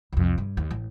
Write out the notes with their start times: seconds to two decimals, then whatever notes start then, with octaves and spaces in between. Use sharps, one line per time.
0.13 C2 F2
0.38 G2
0.57 D#2
0.71 A1